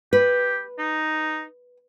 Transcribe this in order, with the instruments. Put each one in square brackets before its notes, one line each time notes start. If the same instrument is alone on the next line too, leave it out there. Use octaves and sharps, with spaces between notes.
[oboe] G4 [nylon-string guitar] B4
[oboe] D#4